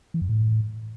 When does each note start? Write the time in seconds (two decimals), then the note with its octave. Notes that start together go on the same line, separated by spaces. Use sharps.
0.14 E3
0.22 F#2
0.29 A2